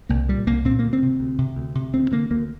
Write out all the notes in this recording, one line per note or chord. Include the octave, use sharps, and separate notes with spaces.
C2 A#3
A#2 G3
C2 A#3
A#2 C4
D2 A#3
C4
C3
D2
C3
D2
C3
D2 C4
D3 A#3
D2 A#3